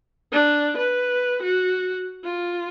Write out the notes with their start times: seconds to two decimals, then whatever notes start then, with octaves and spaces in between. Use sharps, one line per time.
0.32 D4
0.77 B4
1.42 F#4
2.24 F4